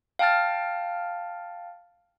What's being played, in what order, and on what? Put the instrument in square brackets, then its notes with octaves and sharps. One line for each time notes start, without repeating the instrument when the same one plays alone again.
[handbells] F5 G5 A5 F6 A6